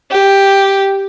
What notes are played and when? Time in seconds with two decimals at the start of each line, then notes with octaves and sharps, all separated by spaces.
0.11 G4